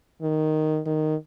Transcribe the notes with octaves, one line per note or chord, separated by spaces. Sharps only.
D#3
D#3